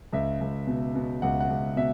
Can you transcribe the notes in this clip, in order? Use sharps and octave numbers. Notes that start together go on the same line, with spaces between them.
C#2 E5
C#2
B2
B2
C#2 F#5
F#5
C#2
B2 E5